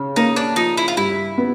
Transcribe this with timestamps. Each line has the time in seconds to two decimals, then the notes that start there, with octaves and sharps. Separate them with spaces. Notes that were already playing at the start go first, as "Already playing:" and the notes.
Already playing: C#3
0.16 A#3 D#4
0.36 D4
0.56 F3 D#4
0.77 E4
0.88 F4
0.97 G2 E4
1.38 B3